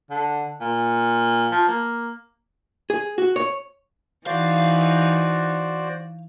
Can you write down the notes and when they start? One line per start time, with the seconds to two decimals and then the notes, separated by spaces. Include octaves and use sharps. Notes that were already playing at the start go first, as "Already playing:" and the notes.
0.11 D3
0.61 A#2
1.51 F3
1.68 A#3
2.90 G#4
3.18 F#4
3.36 C#5
4.27 E3 D#4 F#4 C5 D5 F5